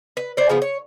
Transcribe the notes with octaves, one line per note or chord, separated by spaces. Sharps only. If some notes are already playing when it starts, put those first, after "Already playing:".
B4
C5 D5
C#3 F3 B3
C#5